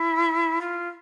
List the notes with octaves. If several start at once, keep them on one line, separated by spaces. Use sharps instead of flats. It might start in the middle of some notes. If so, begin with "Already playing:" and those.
Already playing: E4
F4